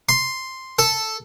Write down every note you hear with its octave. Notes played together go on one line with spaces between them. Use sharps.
C6
A4